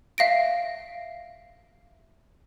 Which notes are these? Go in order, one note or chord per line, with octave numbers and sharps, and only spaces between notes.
E5 F5 A#6 D7